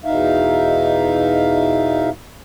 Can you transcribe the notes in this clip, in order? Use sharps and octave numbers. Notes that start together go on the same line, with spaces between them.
E2 B2 D#4 E5 F5